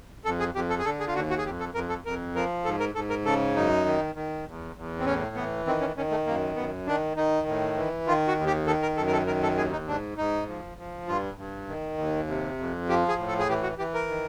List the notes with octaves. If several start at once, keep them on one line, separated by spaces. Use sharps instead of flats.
F2 A4
G#4
F2 G4
A4
G#4
D3 A4
G#4
F4
D#2 F#4
F#4
G#4
F2 G4
A4
F2 A#4
A4
F2 A#4
F3 A#4
G#2 A4
A#4
G#2 A4
A#4
C#3 A4
F#2 D#4
D#3
D#3
E2
E2
C4
A2 C#4
E3 B3
D#3 C4
C#4
D#3 C#4
A3
F#2 A#3
F#2 B3
D#3 D4
D#3 D#4
A2
E3
D#3 F4
F#4
D#2
G4
D#3 A4
A#4
F#2 A4
A#4
A4
D#3 A#4
A4
D#2 G#4
D#4
G#2 D4
G#2 D#4
F3
F3
G2 F4
G2
D#3
D#2
C3
F2
F3 G4
G#4
A2
A4
G#4
E3 G4
F#4
E3 G4
A#4
D#3